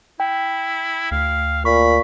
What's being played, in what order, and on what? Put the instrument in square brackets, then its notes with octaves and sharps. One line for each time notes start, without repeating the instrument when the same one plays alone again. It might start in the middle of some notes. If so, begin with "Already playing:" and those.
[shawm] E4 [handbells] G5
[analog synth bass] D2 [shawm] F5
[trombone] A#2 [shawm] B5 [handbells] C#6